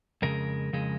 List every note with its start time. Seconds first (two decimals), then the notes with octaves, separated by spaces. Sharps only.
0.22 F2 C#3 G#3 A#4
0.73 F2 C#3 G#3